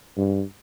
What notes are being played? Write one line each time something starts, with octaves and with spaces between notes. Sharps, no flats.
G2